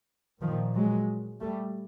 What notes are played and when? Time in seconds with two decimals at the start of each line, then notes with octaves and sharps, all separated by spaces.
0.41 A#2 D#3 F3
0.74 F#3 G#3
1.40 G3 A3